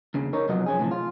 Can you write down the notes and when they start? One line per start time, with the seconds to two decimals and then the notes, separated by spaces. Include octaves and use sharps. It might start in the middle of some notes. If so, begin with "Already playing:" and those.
0.14 D#2 C#3
0.33 D#4 A#4 C#5
0.48 F2 C3 F#3 B3 F4 D#5
0.66 F3 C#4 G#4
0.79 A2 C3 D#3 F3
0.91 F4